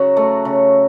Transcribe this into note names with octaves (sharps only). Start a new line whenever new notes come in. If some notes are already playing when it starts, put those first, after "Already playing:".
Already playing: C#3 F#3 F#4
A3
C#3